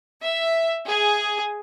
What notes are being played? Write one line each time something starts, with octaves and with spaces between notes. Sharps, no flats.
E5
G#4